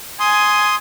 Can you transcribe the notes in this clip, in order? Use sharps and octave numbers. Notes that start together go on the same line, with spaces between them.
G#5 C6 D#6